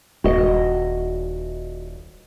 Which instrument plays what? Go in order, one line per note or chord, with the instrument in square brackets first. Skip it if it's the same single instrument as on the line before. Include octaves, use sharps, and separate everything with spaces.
[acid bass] D#1 [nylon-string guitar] F#4 D#5